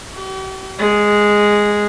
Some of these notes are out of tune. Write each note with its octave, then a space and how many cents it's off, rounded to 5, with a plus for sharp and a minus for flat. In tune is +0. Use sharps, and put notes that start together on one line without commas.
G4 -45
G#3 -5